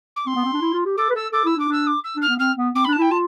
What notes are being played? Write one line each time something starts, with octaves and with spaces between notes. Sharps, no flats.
D6
C4 C6
B3
C4
D4
E4
F4
G4
A4 D6
B4
A4 E6
A4 D6
E4 E6
D4
D6
D4 E6
D6
E6
D4
F6
B3
C4 F6
B3
C4 D6
B5
D4
A5
E4 G5
F4 A5